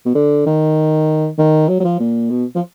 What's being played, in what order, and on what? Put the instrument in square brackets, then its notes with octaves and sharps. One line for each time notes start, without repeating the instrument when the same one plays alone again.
[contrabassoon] B2
D3
D#3
D#3
F#3
F#3
F3
A#2
B2
F3